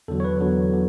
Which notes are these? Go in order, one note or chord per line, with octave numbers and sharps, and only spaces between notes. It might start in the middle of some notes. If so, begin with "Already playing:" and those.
E2 D3 F#3 A4
C#5
B4
E2 D3 F#3
D3 F#3